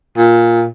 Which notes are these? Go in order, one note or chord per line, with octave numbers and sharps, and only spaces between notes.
A#2